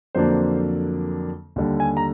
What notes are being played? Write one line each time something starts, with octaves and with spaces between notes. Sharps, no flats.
F2 D3 F#3 A#3 D4 C5
D#2 D3 G3
G#5
A#5